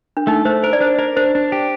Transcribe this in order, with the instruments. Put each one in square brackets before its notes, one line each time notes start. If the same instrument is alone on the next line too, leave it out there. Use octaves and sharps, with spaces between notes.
[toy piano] D4
[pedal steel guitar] A3 [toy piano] D#4
[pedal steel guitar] A3 [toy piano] C5
[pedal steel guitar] A#4 [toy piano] C5
[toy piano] D5
[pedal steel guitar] D4 [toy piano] C5
[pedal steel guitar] A#4 [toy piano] D5
[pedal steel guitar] D4 [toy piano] C5
[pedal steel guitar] D4
G4